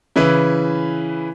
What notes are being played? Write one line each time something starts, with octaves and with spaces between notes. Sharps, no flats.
C#3 E3 E4 B4